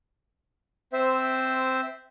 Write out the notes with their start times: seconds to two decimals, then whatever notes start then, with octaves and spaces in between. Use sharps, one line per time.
0.93 C4 C5 E5